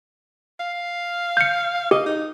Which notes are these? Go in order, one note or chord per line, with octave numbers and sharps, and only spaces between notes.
F5
G6 C#7
G4 D#5
D#4